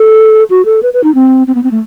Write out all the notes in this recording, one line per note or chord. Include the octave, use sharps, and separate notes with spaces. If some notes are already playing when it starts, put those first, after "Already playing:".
Already playing: A4
F#4
A4
B4
B4
D#4
C4
C4
B3
C4
A3